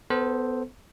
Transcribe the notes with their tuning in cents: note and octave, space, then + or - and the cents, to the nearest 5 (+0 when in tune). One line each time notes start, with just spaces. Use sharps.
B3 +25 A4 +0 C5 +0